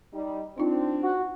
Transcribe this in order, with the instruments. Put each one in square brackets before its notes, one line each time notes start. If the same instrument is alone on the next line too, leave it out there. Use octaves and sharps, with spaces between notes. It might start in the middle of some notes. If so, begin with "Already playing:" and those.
[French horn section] G3 D#4
[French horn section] C4 D4 [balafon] D#4 F4
[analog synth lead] F#4